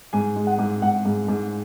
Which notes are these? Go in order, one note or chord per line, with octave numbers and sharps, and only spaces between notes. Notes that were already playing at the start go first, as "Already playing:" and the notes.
G#2 G#5
G#3
F#5
G#2
G#2 F#5
G#2
G#2